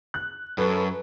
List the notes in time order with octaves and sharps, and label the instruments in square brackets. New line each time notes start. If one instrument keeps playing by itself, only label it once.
[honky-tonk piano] F#6
[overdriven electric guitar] F#2 [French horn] A4 [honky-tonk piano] B4